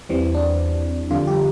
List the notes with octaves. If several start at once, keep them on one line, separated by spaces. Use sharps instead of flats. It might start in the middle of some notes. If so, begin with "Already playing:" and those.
E2 E3 G3 C4
D4
F2 D3 G3 F4
G4